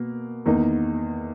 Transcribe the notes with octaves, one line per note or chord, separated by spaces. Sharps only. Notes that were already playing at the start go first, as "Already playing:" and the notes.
Already playing: B2 A#3
E2 D#3 A#3 D#4